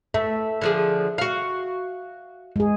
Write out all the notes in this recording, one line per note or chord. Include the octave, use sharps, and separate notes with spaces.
A3 E5
D3 F3 G#4
F#4 F5
G#3 G#4